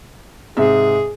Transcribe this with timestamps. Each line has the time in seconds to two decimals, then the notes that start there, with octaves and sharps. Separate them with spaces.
0.57 G#2 C3 G#4 E5